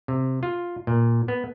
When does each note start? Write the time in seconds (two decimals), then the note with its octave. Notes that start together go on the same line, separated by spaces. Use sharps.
0.08 C3
0.43 F4
0.87 A#2
1.28 B3